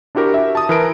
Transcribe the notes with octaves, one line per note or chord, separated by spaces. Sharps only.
D4 E4 F#4 G4 A#4
E5
A5 D#6
E3 A#4 A#5 D7